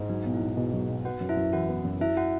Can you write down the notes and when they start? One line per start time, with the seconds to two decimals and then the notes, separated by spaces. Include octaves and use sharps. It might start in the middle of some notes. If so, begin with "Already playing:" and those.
Already playing: G#2
0.09 F#3 D#4
0.25 B1
0.34 E4
0.41 B1
0.57 B2 G#4
0.73 F#3
0.89 B1
1.05 B3 F#4 F#5
1.21 F#2
1.29 E4 E5
1.37 F#2
1.53 E3 F#4 F#5
1.69 B3
1.85 F#2
2.00 F#3 E4 E5
2.17 F#4 F#5